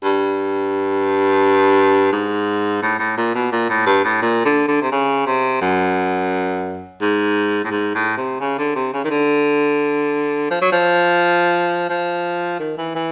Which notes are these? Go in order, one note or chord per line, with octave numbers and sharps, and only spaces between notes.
G2
G#2
A2
A2
A#2
B2
A#2
A2
G2
A2
A#2
D3
D3
C3
C#3
C3
F#2
G#2
A2
G#2
A2
C3
C#3
D3
C3
C#3
D#3
D3
F3
F#3
F3
F3
D#3
E3
E3